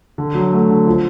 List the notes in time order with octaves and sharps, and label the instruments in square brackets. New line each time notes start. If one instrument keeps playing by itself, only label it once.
[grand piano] D3
F#3
A3
D3
F3